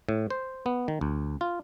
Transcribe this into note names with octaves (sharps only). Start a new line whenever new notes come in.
A2
C5
B3
D#3
D2
F4